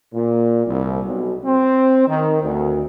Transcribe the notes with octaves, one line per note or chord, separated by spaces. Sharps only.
A#2
C2
B1
C4
D#3
D2